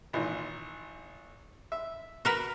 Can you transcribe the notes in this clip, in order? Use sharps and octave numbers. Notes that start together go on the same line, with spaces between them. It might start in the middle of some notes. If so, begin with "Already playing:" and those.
G#1 A#2 E3
E5
F#4 A#4 B4